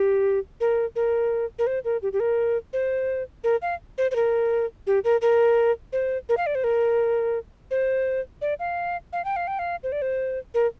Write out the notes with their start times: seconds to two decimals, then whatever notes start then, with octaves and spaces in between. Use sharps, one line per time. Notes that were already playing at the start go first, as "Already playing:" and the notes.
Already playing: G4
0.60 A#4
0.96 A#4
1.59 A#4
1.67 C5
1.85 A#4
2.02 G4
2.13 G4
2.20 A#4
2.73 C5
3.44 A#4
3.62 F5
3.98 C5
4.11 C5
4.16 A#4
4.87 G4
5.04 A#4
5.21 A#4
5.93 C5
6.29 A#4
6.37 F5
6.46 D5
6.55 C5
6.64 A#4
7.71 C5
8.41 D5
8.59 F5
9.13 F5
9.25 G5
9.36 F5
9.47 G5
9.59 F5
9.83 C5
9.92 D5
10.02 C5
10.54 A#4